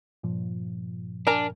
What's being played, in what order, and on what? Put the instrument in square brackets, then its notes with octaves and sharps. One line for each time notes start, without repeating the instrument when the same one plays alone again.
[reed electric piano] G2 A#2 F3
[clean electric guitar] D4 [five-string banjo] A#4 G#5 A#5